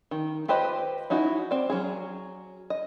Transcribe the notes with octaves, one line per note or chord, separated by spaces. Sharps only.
D#3
F4 G4 B4 C5 D#5
C#4 D#4 E4 F#4
C4 D5
F#3 C#4 G#4
D#5